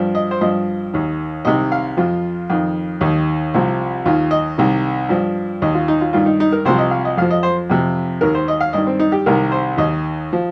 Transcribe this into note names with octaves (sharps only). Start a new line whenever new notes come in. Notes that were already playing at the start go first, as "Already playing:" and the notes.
Already playing: G2 F3
D#5
C5
G2 F3 D#5
D#2 D#3
C2 C3 D#3 D#5
F5
F2 F3 F4
F2 D#3
D#2 D#3 D#4
C2 C3 F3
D#2 D#3 F4
D#5
C2 C3 D#3
G2 F3
D#2 D#3 D#5
F4
D#4
F4
G2 D#3 F4
D#4
D#4
A#4
C2 C3 F3 C5
D#5
F5
D#5
F2 F3 F5
D#5
C5
F2 C3 F3
D#2 D#3 A#4
C5
D#5
F5
G2 D#3 D#5
C4
D#4
G4
C2 C3 D#3 A#4
C5
D#2 D#3 D#5
F3